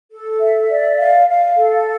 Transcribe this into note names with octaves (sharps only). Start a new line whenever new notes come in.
A4
E5
D5
F5
F5
A4